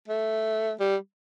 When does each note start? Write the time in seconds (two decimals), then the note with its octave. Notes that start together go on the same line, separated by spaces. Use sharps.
0.08 A3
0.80 G3